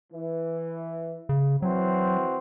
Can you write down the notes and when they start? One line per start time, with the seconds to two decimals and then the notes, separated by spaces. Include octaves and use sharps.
0.12 E3
1.29 C#3
1.62 E3 F#3 C4 F#4